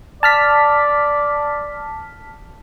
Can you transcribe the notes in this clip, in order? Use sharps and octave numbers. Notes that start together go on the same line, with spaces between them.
D5 A5 F6 B6